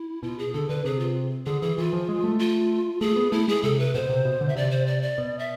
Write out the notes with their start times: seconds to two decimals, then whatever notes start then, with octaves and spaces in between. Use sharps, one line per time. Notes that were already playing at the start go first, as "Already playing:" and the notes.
Already playing: E4
0.23 B2 F4
0.39 G#4
0.54 D3 A4
0.69 D3 B4
0.85 C3 G#4
1.00 F4
1.46 D3 G#4
1.62 E3 G#4
1.77 E3 F4
1.93 F3
2.09 G#3
2.24 A3
2.39 F4
3.01 A3 G#4
3.16 B3
3.32 A3 E4
3.48 G#3 G#4
3.63 C3 A4
3.79 B4
3.94 B2 C5
4.09 C3
4.25 B2
4.41 D3
4.49 E5
4.56 C3 D5
4.71 C5
4.86 D5
5.02 D5
5.18 B2
5.39 E5